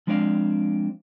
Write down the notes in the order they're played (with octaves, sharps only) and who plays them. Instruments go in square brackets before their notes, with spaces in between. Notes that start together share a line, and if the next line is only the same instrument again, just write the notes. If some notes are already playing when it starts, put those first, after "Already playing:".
[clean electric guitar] F3 G#3 C4 D4 D5 F5